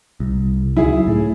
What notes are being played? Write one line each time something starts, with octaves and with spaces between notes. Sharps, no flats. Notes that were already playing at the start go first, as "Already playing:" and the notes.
C2
C#2 F#3 E4 G#4
A2